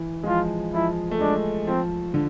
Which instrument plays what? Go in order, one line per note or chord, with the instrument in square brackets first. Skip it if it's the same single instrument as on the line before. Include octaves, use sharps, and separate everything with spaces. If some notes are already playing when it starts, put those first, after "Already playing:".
Already playing: [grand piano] E3
G#3
[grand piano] F3 [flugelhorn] F4
[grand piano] F3 [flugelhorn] E4
[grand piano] A3
[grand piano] G#3 [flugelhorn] D4
[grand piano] F3 [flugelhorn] C4
[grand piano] D3